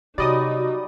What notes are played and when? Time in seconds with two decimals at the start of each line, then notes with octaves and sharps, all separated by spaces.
0.18 C3 F#3 G3 D#4 F#4 D5 D#5 D#6